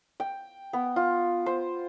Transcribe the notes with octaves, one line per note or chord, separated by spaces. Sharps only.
G5
B3
F4
C5